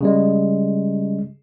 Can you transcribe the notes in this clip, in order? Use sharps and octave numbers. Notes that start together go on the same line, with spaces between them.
C#3 G3 G#3